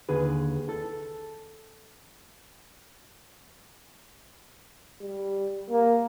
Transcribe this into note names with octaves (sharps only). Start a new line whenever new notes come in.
D#2 D3 G#4 B4
A4
G3
A#3